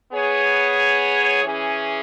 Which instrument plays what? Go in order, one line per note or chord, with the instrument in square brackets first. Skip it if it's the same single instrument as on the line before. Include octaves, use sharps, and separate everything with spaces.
[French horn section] B3 G#4 C#5
E3 C#4 G#4